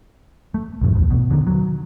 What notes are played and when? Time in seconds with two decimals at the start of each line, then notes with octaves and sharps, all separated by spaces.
0.54 A3
0.81 B1 F2 A2
0.95 A1 D#2 G#2
1.10 B2
1.31 D3 D#3
1.47 F#3